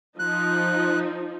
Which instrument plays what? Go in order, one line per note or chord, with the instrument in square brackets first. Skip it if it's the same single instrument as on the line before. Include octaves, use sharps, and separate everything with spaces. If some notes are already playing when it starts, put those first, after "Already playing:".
[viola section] F3 D#4 [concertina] F#6